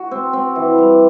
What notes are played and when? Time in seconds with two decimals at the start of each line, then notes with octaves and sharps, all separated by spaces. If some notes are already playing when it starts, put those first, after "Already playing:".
Already playing: F#4
0.11 C4
0.33 C4
0.56 E3
0.78 G3